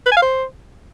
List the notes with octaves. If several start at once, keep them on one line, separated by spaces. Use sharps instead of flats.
B4
G#5
F5
C5